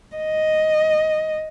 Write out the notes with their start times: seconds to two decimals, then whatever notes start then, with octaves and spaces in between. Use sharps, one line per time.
0.17 D#5